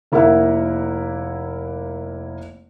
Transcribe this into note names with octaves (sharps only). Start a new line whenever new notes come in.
F1 A#3 E4 A#4 E5 F#5